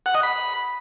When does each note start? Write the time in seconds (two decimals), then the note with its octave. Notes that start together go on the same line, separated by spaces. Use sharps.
0.06 F#5
0.15 D#5
0.23 B5